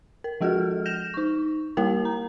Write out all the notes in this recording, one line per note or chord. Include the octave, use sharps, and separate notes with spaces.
A#4
F3 G#3 F#4 G#4 A4 F6
F6 G6 A#6 E7 F7
D#4 C#6
G3 A#3 E4 A#4 G5
A#5